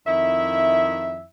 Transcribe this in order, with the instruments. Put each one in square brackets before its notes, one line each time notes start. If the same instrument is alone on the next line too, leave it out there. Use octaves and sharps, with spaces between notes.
[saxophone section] F2 D#3 E4 E5